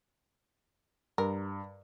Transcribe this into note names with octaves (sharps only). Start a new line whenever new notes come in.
G2 A#4